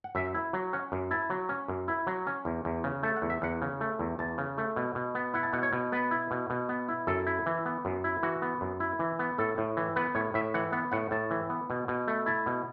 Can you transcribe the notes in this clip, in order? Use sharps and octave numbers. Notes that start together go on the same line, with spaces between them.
F#5
F#2 E5
E4
F#3
C#4 F#5
F#2
E4 A5
F#3
C#4
F#2
E4
F#3
C#4
E2
E2
C#3
A3 A5
F#5
E2
E5
E2 F#5
C#3
A3
E2
E2 A5
C#3
A3
B2
B2
B3
E4 F#5
A5
B2 F#5
C#5
B2
B3 B4
E4
B2
B2
B3
E4
F#2 A4
E4
E3
B3
F#2
E4
E3 F#4
B3
F#2
E4
E3
B3
A2 A4
A2
E3
B3 B4
A2 C#5
A2 E5
E3 F#5
B3 F#5
A2 F#5
A2 A5
E3
B3
B2
B2
A3
E4 A5
B2